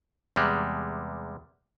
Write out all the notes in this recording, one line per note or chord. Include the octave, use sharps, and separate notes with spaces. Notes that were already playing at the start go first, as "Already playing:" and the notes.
E2 C3 G3 G#3